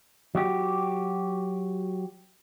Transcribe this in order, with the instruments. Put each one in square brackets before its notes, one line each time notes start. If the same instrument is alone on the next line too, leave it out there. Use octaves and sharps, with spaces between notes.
[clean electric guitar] F#3 F#4 G4